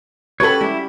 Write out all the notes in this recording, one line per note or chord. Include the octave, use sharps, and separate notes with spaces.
C#4 F#4 G4 A4 B4 C#5 B5
G3 E4